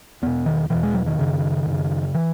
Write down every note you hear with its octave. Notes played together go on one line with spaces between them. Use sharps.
E2 B2 B3
D#3
E2 B2 E3
G#3
F#3
D#3
F#2 C#3
F#2 C#3
E3